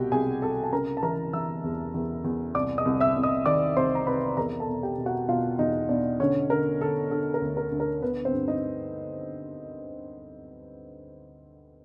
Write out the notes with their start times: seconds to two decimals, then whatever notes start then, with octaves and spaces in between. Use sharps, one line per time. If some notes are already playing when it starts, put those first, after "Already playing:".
Already playing: C2 B2 F#4 G4 G5
0.12 C2 G#4 G#5
0.42 C2 A4 A5
0.64 A5
0.72 C#3 A#4 A#5
0.97 A5
1.03 E3 A#4 A#5
1.33 E3 E5 E6
1.64 E2
1.94 E2
2.24 E2
2.55 C2 D5 D6
2.78 D#5 D#6
2.85 C2
3.00 E5 E6
3.16 C2
3.23 D#5 D#6
3.46 D#3 D5 D6
3.76 C2 C5 C6
3.95 A#5
4.07 C3 B4 B5
4.37 E2 A#4 A#5
4.60 A4 A5
4.67 B2
4.83 G4 G5
4.98 B2
5.06 F#4 F#5
5.29 B2 F4 F5
5.59 E2 D#4 D#5
5.89 B2 D4 D5
6.20 D3 C#4 C#5
6.50 D3 A#4
6.80 D3 A4
7.11 D3 A4
7.34 A#4
7.42 D2
7.57 A#4
7.72 D2
7.80 A#4
8.02 D3 B3 B4
8.25 C4 C5
8.33 G2
8.47 D#4 D#5